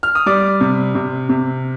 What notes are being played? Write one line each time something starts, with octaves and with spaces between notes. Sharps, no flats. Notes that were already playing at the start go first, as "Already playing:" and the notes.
F6
D#6
G3 D5 D6
C3
C3
C3